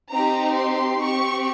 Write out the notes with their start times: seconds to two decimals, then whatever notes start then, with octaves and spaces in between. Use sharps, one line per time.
0.11 C4 D#4 G4 A#5
0.57 C6
1.00 C4 G4 C#6